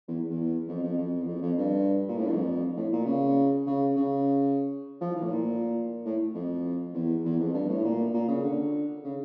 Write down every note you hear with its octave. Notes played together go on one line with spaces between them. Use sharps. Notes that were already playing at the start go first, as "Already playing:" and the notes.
E2
E2
F2
F2
F2
E2
F2
F2
G2
A#2
A2
G2
F2
A2
A#2
C#3
C#3
C#3
F3
E3
A2
A#2
A2
F2
E2
E2
F2
G2
A2
A#2
A#2
C#3
D3
C#3